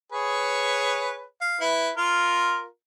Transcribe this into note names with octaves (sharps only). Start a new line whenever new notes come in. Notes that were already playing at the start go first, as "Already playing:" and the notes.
G#4 B4 C#5
F5
E4 B4
F4 A#4